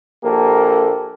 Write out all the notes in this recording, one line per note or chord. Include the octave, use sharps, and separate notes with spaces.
A#1 A#3 G4 A4